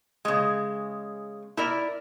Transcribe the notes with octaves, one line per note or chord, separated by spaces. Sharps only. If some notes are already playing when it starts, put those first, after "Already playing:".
C#3 G#3
E4 A#4 D5